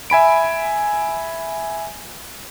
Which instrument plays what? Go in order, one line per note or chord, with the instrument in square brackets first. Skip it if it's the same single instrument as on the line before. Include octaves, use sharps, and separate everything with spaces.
[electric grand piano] E5 G#5 B5 D7